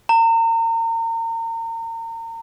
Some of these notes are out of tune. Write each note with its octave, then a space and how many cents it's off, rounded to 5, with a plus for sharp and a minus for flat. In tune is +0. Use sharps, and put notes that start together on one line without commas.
A#5 -35